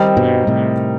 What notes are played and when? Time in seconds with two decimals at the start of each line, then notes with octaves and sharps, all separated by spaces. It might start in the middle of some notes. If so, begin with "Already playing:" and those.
Already playing: D#3 G3 C4 D#4
0.17 G2 B2
0.47 A2 C3